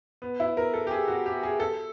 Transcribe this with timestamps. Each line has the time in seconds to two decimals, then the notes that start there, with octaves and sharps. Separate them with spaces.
0.22 B3
0.40 E4
0.57 A#4
0.74 A4
0.87 G4
0.91 G#4
1.08 F#4
1.26 G4
1.43 G#4
1.60 A4